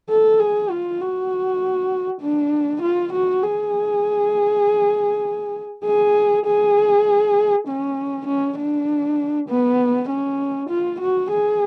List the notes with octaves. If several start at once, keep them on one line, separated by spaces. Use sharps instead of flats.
A4
G#4
F4
F#4
D4
F4
F#4
G#4
G#4
G#4
C#4
C#4
D4
B3
C#4
F4
F#4
G#4